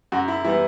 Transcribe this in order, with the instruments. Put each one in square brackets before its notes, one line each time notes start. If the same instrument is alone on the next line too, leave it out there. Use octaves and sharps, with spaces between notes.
[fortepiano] F#2 F#4
E4
E3 G3 B3 E4